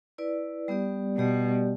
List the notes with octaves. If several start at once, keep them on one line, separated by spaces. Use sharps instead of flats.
E4 B4 D5
G3 B3 G4 D5
B2 G3 B3 G4 D5